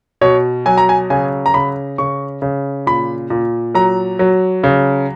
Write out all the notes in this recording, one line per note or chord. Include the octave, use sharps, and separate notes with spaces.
B2 C#5
F#3 G#5
A#5
G#5
C#3 G#5
A#5
C#3 B5
C#3 C#6
C#3
A#2 B5
A#2
F#3 A#5
F#3
C#3